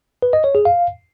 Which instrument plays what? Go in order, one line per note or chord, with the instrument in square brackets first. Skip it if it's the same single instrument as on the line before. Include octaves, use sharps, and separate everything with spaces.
[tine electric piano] B4
D#5
C#5
G#4
F5